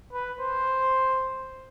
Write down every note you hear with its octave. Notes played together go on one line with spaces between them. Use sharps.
B4
C5